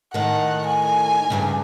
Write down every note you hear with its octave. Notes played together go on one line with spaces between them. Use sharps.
A2 D#3 F#5
G#5
D2 G2 C#3